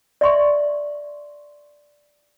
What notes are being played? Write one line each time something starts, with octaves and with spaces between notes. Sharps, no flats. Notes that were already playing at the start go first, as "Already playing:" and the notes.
D5 E5 C6 C#6